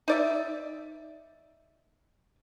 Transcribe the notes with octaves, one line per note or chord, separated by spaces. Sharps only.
D#4 D5 E5